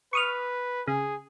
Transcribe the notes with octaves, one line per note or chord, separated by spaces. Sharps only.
B4 C#6 D#6 F6
C#3 G#4